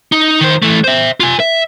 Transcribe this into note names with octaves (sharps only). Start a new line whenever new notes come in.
D#4
D#3 C5
E3 A3
C5 E5
F4 G#5
E5